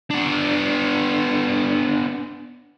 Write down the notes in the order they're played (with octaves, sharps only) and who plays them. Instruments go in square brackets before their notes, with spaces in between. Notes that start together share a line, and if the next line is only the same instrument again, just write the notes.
[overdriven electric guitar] B3 D4